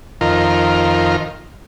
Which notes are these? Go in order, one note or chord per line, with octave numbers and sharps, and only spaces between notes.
F2 D#3 F4 A#4